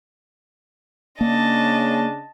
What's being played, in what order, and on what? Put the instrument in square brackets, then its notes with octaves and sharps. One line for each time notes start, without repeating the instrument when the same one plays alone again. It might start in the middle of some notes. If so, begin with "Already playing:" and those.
[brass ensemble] C#3 D4 [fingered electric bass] A#3 [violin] D#5 A5